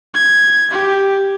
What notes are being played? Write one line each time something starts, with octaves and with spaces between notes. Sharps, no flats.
G#6
G4